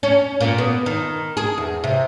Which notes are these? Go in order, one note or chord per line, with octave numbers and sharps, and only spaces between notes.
C#4
A#2
B3
D#3
G#4
E2
C3